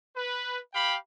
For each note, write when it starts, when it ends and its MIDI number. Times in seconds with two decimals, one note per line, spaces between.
0.16 0.58 71
0.74 0.96 67
0.74 0.96 77
0.74 0.96 79
0.74 0.96 83